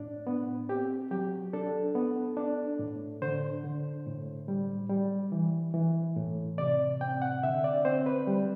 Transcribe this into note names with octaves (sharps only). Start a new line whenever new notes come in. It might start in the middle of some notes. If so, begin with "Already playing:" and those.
Already playing: A2 D4
B3
C4 G4
F#3 G4
D4 A4
B3
D4
A2
D3 C5
D3
A2
G3
G3
E3
E3
A2
C3 D5
C4 G5
F#5
D3 E5
D5
C4 C5
B4
G3